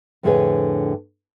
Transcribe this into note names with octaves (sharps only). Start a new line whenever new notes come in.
F2 A2 D3 G#4 B4 C#5